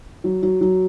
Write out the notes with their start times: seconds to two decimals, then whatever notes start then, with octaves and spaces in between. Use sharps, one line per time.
0.24 F#3
0.43 F#3
0.61 F#3